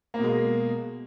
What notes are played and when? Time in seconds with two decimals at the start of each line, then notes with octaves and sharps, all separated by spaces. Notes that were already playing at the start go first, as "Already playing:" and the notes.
0.14 A#3
0.19 B2
0.24 G#3